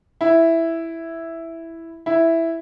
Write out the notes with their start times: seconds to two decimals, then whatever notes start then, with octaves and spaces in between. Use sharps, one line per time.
0.21 E4
2.06 E4